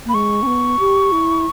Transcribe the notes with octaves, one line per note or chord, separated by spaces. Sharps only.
A#3
B5
G#3 C#6
C#4
B3
G4
E4